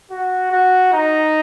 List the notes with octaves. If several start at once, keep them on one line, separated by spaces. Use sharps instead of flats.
F#4
F#4
D#4